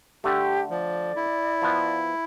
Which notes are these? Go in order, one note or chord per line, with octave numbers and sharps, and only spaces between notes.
D3 A3 G4
F3 D5
E4
F3 B3